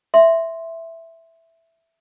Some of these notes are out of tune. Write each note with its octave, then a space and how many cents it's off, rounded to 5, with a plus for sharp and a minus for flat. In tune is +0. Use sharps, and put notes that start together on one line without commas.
E5 +0 C6 +0